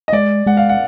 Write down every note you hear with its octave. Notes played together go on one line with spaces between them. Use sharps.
D#5
G#3 D5
G#3 F#5
F5
F#5